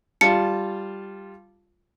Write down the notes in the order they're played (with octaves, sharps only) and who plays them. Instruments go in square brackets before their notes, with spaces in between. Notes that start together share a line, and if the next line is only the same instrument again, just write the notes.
[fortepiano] G3 F4 A5 [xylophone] C#7